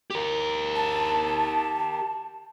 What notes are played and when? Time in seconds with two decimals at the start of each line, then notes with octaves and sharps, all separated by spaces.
0.10 G4 A#4
0.76 A5